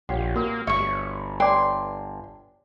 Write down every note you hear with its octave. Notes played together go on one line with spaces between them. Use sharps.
A#1 F4 G4 C#5 F#5
A#3 F#4 A#4
G1 C#5 E5 C#6
B4 C#5 D5 E5 G5 C6 D6